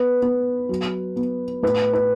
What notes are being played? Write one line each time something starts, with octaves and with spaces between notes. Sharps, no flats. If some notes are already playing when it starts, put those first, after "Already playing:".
Already playing: B3 B4
B3
F#3
B3
A2 B4
B4